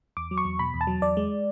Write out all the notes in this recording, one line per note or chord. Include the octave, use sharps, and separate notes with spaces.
E2 D6
F#3
C#6
E2
B2 B5
E2
A5
F#3
E2 D5
G#3